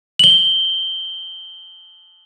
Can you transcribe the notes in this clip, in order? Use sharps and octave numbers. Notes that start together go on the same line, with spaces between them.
F#7 G7